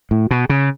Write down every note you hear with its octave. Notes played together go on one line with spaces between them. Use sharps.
A2
B2
C#3